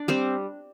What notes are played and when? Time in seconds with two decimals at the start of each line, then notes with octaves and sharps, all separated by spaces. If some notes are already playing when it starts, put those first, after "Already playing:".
Already playing: D4 D5
0.08 G3 C4 C5